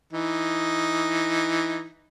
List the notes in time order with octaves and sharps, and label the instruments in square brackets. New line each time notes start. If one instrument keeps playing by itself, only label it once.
[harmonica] E3 D#4